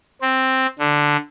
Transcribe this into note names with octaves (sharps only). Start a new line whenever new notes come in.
C4
D3